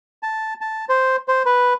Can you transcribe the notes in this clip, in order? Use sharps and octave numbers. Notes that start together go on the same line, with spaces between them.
A5
A5
C5
C5
B4